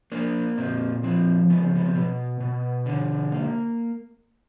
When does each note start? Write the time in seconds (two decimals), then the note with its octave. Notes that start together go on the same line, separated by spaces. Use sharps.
0.12 A#3 D4
0.57 A#2 C4
1.03 F3 C4
1.50 C#3 B3
1.63 C4
1.75 B3
1.86 C4
1.95 B2 B3
2.40 B2
2.86 D3
3.32 A#3